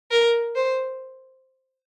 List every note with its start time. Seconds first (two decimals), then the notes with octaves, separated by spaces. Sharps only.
0.11 A#4
0.55 C5